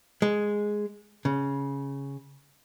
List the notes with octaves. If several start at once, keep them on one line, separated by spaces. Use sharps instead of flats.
G#3
C#3